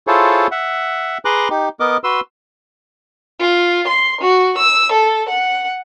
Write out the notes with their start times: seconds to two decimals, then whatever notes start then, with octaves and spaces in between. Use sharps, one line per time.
0.07 E4 F4 G#4 A4 C5 C#5
0.51 E5 F#5
1.25 G#4 B4 A#5 C6 D6 F#6
1.50 D#4 G4
1.80 B3 A#4 D#5 D6
2.04 F#4 B4 C6 E6
3.40 F4
3.88 C6
4.21 F#4
4.57 E6
4.92 A4
5.29 F#5